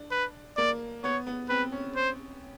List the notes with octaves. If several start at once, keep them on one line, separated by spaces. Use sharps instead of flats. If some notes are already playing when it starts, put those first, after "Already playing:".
Already playing: D4
B4
A#3 D5
B3 C#5
B3
C4 B4
C#4
C5